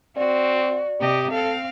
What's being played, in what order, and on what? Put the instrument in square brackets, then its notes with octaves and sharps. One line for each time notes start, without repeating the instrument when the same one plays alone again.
[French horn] C4 [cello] F#4 [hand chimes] D5
[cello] C3 D#5 [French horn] G4
[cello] C4 F5 [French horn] A4